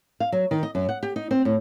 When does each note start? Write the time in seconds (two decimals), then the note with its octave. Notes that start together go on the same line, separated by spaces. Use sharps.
0.20 F5
0.32 F#3
0.51 D#3
0.63 D#5
0.75 F#2
0.89 F#5
1.03 G4
1.16 D#4
1.31 C4
1.45 A2